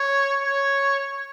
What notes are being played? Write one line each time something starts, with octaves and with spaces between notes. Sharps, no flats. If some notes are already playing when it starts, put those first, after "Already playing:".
Already playing: C#5
C#5